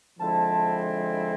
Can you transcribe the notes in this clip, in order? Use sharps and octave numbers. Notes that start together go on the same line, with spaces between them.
D3 F3 G#3 C4 E4 A5